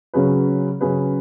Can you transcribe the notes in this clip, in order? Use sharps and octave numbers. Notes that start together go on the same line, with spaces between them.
C#3 F#3 C#4 G#4 B4
C#3 F#3 C#4 G#4 B4